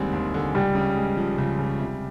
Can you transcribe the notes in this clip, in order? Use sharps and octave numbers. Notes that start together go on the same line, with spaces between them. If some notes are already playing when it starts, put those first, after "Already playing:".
Already playing: D#2 D3 G3 G#3 C4
D#2
D3
C#2 G3
C#3
G#3
F3
C#2
C#3
C3